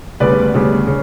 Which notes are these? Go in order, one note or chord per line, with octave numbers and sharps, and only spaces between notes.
D2 C#3 G3 B3 B4 D5
D2 C#3 G3 B3
C#3